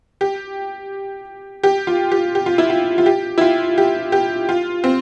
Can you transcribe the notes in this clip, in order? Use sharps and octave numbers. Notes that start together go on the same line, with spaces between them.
G4
G4
F4
G4
G4
F4
E4
F4
F4
G4
E4
F4
G4
G4
F4
C4